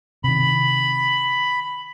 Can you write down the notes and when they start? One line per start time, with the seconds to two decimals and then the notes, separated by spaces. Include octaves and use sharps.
0.24 C3 D#3 B5